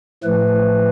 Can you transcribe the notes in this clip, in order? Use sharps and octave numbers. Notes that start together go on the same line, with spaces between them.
A2 F3 A3 B4